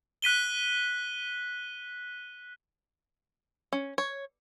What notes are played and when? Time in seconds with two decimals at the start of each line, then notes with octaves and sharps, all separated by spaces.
0.22 F#6 B6 D#7 G7
3.73 C#4
3.98 C#5